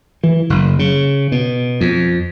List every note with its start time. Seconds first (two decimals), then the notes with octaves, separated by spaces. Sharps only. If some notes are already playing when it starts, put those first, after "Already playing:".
0.23 E3
0.50 F#1
0.79 C#3
1.32 B2
1.81 F2